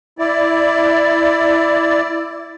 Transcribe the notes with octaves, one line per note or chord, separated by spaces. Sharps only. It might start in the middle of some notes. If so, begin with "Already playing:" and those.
E4 D5